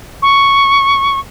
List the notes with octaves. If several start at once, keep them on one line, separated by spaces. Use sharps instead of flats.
C#6